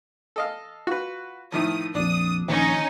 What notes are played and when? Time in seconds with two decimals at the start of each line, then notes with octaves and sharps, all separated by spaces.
0.36 A4 D#5 F5
0.87 F4 F#4 B4
1.52 A2 D#3 F3 D#6
1.95 A#1 F2 D4 D#6
2.48 A#1 D#3 C#4 D#4